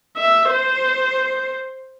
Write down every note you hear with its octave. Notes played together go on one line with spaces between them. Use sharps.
E5
C5